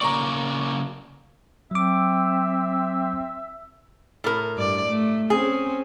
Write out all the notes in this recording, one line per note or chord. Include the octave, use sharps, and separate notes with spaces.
C#3 A#3 D5 A#5 C#6
F#3 C4 E5 D6
A2 A#4
G2 D5
A3
C4 C#4 G#4